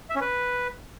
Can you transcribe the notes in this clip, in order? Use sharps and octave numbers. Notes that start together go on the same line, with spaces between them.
E5
C#4
B4